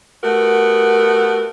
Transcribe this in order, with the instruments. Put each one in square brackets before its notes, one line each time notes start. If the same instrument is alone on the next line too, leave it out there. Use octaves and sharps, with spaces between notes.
[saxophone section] A3 B3 F#4 G4 A#4